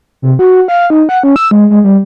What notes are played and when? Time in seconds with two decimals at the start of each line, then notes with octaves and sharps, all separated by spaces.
0.22 C3
0.39 F#4
0.68 F5
0.90 D#4
1.09 F#5
1.23 C#4
1.36 E6
1.51 G#3
1.70 G#3
1.84 G3